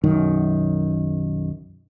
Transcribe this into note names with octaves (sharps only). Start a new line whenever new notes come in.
B1 F#2 D#3